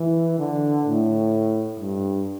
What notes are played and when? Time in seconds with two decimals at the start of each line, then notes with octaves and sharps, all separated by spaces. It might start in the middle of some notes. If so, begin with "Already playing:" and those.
Already playing: E3
0.39 D3
0.86 A2
1.80 G2